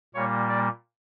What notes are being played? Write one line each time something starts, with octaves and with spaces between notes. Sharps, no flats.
A#2 G3 A#3 C#5
D5